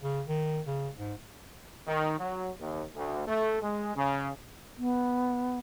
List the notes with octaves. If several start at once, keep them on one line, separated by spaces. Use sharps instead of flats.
C#3
D#3
C#3
G#2
D#3
F#3
D#2
D2
A3
G#3
C#3
B3